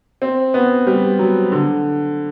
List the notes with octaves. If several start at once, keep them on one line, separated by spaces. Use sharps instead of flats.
C4
B3
G3
F#3
D3